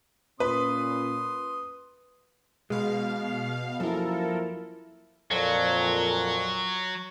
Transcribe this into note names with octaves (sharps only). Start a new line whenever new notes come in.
A#2 C#4 B4 C6 D#6
B2 G#3 F5
F#2 F3 A#3 E4 A4 A#4
F2 A#2 F#3